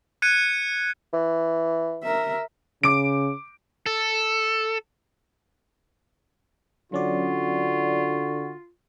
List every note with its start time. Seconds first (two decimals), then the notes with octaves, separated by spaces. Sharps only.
0.22 F#6 G#6 C#7 D#7
1.13 E3
2.03 A#4 E5
2.83 C#3 D6 D7
3.86 A4
6.92 D3 F#3 C#4 F4 F#4 D5